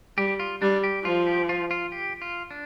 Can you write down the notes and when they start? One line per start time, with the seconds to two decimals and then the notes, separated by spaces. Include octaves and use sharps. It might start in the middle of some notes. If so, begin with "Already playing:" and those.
0.17 G3 G4
0.40 F4
0.62 G3 D4
0.83 G4
1.04 F3 F4
1.27 G4
1.49 F4
1.71 F4
1.92 G4
2.22 F4
2.51 D4